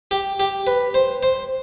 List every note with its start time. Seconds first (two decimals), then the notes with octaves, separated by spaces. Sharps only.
0.11 G4
0.40 G4
0.67 B4
0.94 C5
1.23 C5